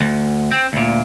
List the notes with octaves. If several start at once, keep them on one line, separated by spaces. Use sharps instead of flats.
D2
C4
D2 A#2